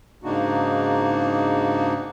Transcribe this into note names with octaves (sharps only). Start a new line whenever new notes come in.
G#2 C#3 A#3 D4 D#4 F#4